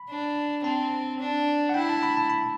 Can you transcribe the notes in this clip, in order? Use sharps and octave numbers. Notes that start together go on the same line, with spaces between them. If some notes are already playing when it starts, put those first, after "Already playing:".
Already playing: B5
D4
C4 A5
D4
F#5
E4 G5
A5
B5
A5
B5